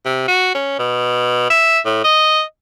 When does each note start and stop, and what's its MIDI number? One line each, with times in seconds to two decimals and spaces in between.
0.06 0.23 48
0.28 0.54 66
0.55 0.75 61
0.79 1.47 47
1.50 1.79 76
1.85 2.03 45
2.04 2.42 75